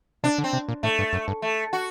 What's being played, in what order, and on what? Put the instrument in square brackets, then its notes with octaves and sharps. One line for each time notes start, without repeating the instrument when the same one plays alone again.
[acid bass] C3 [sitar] D4
[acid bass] D3
[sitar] C4
[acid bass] C3
A#2
[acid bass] A2 [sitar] A3
[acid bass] G2
F#2
G2
[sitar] A3
F#4